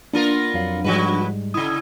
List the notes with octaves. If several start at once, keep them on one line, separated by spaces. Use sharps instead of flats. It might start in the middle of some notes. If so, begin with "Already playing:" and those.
A#3 B3 D4 F4 A#4
F2 F#3 F5
G#2 F3 G3 G#3 F#4 B4
C#3 E4 D#6